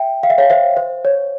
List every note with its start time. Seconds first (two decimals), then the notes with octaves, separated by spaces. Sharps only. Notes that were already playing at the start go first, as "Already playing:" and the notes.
Already playing: E5 G5
0.23 F5
0.30 E5
0.38 C#5 F5
0.50 C5 E5
0.77 C5
1.05 C#5